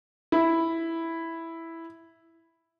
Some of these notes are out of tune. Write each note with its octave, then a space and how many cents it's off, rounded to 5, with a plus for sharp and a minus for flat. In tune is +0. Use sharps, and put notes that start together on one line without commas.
E4 +0